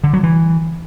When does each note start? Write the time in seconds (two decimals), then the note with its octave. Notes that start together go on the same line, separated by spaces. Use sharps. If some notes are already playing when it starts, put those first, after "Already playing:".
0.04 D3
0.13 F#3
0.23 E3